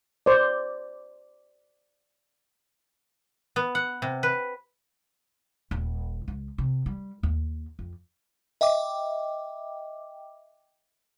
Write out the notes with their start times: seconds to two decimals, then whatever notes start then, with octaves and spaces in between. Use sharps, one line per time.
0.26 C5 D5
3.56 B3
3.75 F#5
4.02 C3
4.23 B4
5.71 D#1
6.28 C#2
6.58 C3
6.86 G3
7.23 D#2
7.79 F2
8.61 D#5 E5 G5 D6